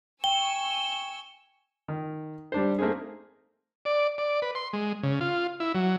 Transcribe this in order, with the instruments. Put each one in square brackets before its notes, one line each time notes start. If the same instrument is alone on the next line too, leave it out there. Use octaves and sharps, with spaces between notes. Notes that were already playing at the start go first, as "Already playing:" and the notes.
[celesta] G5 [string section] G#5 C#6 E6 [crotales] G7
[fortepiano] D#3
G3 D4 C5
A3 A#3 C4 D#4 G#4
[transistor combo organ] D5
D5
B4
C6
G#3
C#3
F4
E4
F#3